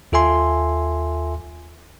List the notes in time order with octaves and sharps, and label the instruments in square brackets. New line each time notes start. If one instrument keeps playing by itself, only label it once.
[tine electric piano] D#2 F4 A4 E5 G#5 C6